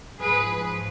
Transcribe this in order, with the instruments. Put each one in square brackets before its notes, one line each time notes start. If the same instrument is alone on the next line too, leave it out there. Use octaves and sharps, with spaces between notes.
[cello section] G#2 F3 G#4 B4